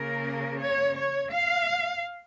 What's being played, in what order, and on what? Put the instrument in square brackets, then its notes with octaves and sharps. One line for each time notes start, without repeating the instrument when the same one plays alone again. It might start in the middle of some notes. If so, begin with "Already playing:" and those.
Already playing: [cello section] C#3 A#3 A#4
C#5
C#5
F5